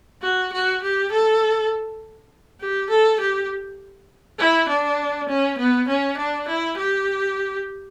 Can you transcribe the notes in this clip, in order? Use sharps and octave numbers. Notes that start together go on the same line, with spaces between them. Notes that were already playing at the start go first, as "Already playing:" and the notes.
F#4
F#4
G4
A4
G4
A4
G4
E4
D4
C#4
B3
C#4
D4
E4
G4